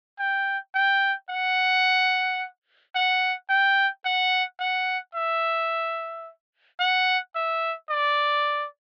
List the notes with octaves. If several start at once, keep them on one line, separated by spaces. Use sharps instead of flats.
G5
G5
F#5
F#5
G5
F#5
F#5
E5
F#5
E5
D5